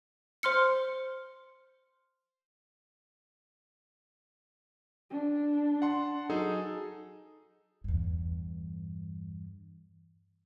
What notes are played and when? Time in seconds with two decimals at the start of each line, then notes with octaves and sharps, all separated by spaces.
0.43 C5 C6 F6 C#7
5.10 D4
5.82 F#5 A5 C6
6.30 F#3 D#4 G#4 A4
7.84 E2 G2